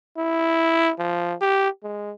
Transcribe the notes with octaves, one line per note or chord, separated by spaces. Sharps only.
E4
F3
G4
G#3